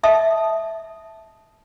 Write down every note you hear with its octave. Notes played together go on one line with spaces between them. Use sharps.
D#5 E5 A5 D#6